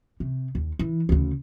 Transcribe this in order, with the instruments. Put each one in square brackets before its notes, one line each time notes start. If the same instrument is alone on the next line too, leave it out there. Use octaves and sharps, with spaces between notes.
[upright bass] C3
D#2
E3
D2 C#3